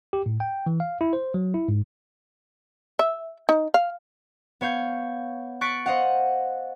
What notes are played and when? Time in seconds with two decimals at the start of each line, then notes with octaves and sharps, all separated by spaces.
0.13 G4
0.26 A2
0.40 G5
0.66 E3
0.80 F5
1.01 E4
1.13 C5
1.34 F#3
1.54 E4
1.68 G#2
2.99 E5
3.49 D#4
3.74 F5
4.61 B3 C#5 F5 G6
5.61 C#6 F#6 A6 B6 C#7 D7
5.86 C5 D#5 F5 F#5